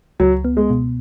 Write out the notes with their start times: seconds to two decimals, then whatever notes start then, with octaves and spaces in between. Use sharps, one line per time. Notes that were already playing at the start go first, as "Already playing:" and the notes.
0.20 C#2 F#3
0.45 B3
0.57 G#3
0.70 B2